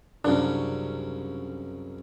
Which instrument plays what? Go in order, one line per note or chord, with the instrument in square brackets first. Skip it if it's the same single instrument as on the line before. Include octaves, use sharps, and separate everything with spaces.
[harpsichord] C2 F#2 C#3 [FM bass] D4